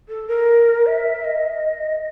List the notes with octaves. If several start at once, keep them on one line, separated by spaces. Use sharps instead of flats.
A4
A#4
E5
D#5